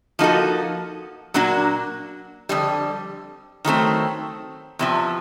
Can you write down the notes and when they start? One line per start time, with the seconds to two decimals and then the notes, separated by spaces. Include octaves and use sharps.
0.19 F3 A#3 D#4 F#4 A4
1.34 A#2 F#3 A#3 D4 F#4
2.49 F2 D3 G3
3.65 D#3 F#3 A3 C4
4.79 E2 C3 F3